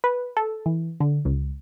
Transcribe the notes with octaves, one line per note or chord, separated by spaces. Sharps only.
B4
A4
E3
D3
C#2